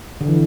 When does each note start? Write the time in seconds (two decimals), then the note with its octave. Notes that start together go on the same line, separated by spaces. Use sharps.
0.21 D3
0.28 E3